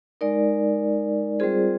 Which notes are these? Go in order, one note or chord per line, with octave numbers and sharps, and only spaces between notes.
G#3 D#4 A#4 D5
G3 C4 F4 G#4 C5